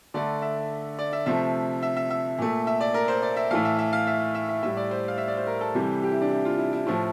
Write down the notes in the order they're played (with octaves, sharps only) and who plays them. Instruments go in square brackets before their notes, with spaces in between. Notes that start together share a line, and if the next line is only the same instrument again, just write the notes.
[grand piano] D3 A3 D5
E5
D5
E5
C3 F3 A3 E5
E5
E5
E5
A#2 A3
E5
D5
A#4
C5
D5
E5
A2 E3 A3 F5
E5
E5
F5
E5
E5
E5
A2 G3 E5
D5
C5
F5
E5
D5
C5
A#4
A4
C3 E3 G3
G4
E4
D4
E4
F4
E4
E4
A2 F3 A3 E4